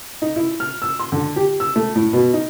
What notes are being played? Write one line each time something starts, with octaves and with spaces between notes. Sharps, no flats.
D#4
E4
F6
E6
C6
D3
G4
E6
A3
A2
B2
D#4